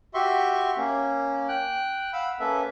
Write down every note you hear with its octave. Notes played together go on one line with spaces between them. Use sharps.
F#4 G4 E5 C6 C#6
A#3 C#4
G5 F#6
F5 F#5 B5 E6
A#3 C#4 A4 B4 E5